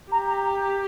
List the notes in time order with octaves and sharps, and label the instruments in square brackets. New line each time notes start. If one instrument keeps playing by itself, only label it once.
[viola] G4 [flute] A#5
[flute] A#5